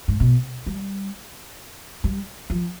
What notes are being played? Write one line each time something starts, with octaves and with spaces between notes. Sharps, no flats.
G#2
B2
G3
G3
F3